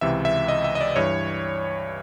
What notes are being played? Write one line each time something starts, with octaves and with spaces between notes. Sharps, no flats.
C#2 C3 E3 E5
E5
D#5
E5
D#5
D5
G2 E3 C#5